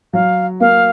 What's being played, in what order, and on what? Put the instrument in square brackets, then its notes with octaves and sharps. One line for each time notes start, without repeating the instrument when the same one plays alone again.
[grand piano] F#3 [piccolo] F5
[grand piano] A#3 [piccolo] F5